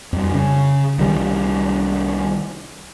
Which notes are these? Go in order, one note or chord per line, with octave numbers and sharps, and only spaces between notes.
F2 G3
C#3
C2 D#3 G3